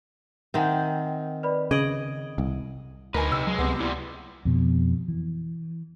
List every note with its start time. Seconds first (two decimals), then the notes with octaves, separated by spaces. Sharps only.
0.54 D#3 C4 E5 F#5 G#5
1.43 B4 D5 B5
1.71 C#3 D#5 G#6 D7 F#7
2.38 C2
3.14 D2 D#4 A#4 B4 G#5
3.32 C3 E6
3.47 F#3 G#3
3.59 C#2 C3 B3
3.80 A#2 G3 E4
4.45 F2 B2
5.08 E3